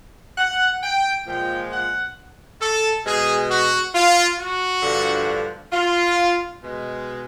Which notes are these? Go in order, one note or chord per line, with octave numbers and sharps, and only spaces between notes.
F#5
G5
A#2 F3 G#3 G5
F#5
A4
B2 G#3 G#4
F#4
F4
F#4
G2 D3 F3
F4
B2 G#3